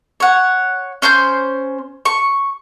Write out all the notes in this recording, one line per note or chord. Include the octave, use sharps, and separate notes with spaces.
C#5 F#5
C#4 C5 C6 G6
C#6